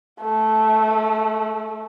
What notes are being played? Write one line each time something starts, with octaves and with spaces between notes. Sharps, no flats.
A3